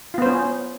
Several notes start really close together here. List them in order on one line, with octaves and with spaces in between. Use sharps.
F4 B3 C5 C#4